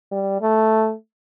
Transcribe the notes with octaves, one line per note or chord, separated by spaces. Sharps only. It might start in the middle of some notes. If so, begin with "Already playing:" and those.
G3
A3